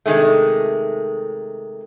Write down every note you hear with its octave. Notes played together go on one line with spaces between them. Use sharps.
C3 D#3 G#3 A3